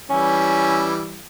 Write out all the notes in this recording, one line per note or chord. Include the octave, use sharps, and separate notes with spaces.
E3 G3 C#4 E4